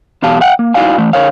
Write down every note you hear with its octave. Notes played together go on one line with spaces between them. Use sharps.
E2 B2 G4 F5 A5
E5 F#5 G5
A#3
D#4 E4 F#4 D5 F5 G#5
E3 A3
D3 A#4 C#5 F5